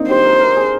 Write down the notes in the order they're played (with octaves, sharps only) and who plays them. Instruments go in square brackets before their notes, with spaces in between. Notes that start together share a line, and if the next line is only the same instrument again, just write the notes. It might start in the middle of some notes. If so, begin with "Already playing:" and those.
Already playing: [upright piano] A#3 C4 D4 D#4
[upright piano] G4 [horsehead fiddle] C5
[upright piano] A#4
A#4
G#4